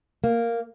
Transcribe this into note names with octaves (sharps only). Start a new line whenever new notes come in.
A#3